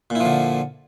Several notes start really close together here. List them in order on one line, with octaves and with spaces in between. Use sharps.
A#2 E4 F3 D3